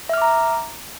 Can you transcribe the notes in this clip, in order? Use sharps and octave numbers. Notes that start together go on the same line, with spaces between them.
E5 A#5 D6 F6